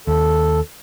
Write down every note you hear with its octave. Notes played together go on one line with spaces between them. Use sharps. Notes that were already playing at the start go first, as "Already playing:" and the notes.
D#2 A4